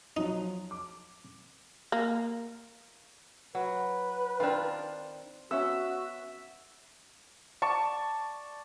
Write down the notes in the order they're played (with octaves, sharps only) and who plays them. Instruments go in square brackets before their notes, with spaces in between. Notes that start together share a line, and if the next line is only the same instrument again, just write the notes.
[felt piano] F3 F#3 [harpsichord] D#4
[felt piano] D6
[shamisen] A#3
[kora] F#3 [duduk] B4
[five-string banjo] D#3 D4 [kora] C4 F4
[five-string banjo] B3 C#4 [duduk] F#4 [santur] E5
[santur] D5 A5 C#6